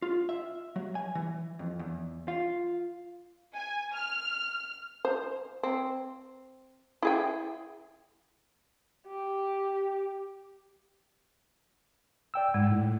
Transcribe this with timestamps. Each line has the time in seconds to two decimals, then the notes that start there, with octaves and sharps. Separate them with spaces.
0.02 F4
0.29 E5
0.76 F#3
0.95 G#5
1.15 E3
1.59 F2
1.79 E2
2.28 F4
3.56 G#5
3.94 F6
5.05 C5
5.63 C4
7.02 E4 G#4 G5
9.07 G4
12.34 D5 G5 E6
12.54 G#2 G#3
12.71 A2